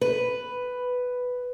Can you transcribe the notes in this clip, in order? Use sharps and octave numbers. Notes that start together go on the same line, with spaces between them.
B4